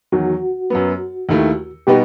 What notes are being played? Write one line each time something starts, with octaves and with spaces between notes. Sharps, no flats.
E2 D#3 F#3 F#4
F#2 F#3 B3
D#2 D#3 A3 E4
B2 G3 B3 D#4 G4